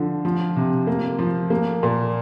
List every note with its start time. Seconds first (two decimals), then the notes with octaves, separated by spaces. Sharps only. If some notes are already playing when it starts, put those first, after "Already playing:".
Already playing: D3 F3
0.25 F3
0.56 C3
0.87 A#3
1.19 F3
1.50 A#3
1.83 A#2